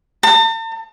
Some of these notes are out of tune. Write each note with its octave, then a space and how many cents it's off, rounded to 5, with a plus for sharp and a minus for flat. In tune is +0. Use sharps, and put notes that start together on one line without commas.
A5 +45